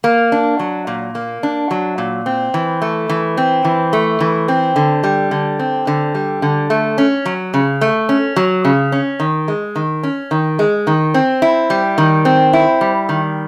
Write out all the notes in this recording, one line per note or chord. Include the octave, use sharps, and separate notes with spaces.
A#3
D4
F#3
A#2
A#3
D4
F#3
A#2
C4
E3
A3
E3
C4
E3
A3
E3
C4
D3
G3
D3
C4
D3
G3
D3
A3
C#4
F#3
C#3
A3
C#4
F#3
C#3
C#4
D#3
G#3
D#3
C#4
D#3
G#3
D#3
C4
E4
G3
D#3
C4
E4
G3
D#3